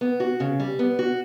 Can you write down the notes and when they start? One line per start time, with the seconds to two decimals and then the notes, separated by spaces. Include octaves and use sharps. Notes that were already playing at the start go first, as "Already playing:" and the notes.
0.01 B3
0.20 F#4
0.40 C#3
0.60 G3
0.79 B3
0.99 F#4